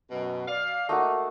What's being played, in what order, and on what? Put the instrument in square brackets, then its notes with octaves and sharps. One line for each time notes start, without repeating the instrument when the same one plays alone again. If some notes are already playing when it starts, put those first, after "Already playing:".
[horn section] F#2 B2
D5 F5
[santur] A3 A#3 F#4 [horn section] D#4